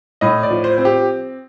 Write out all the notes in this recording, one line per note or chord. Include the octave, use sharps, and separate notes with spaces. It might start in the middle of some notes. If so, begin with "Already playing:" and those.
A2 D#5
D5
F3
C5
C4
G4